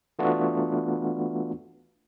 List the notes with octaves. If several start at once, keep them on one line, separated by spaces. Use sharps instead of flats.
E3 A3 B3 D4 F4 F#4